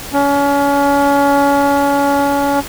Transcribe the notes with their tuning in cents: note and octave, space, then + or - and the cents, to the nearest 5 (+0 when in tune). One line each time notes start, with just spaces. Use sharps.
C#4 +30